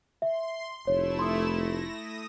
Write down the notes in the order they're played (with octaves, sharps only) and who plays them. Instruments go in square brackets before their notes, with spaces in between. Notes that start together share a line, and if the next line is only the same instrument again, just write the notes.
[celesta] E5 [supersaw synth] C6
[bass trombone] F1 [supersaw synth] A3 E4 E7 [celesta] C#5
[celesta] C6 D#6
[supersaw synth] A#6
D#6